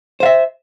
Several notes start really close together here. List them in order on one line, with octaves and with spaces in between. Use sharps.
C5 F5 E5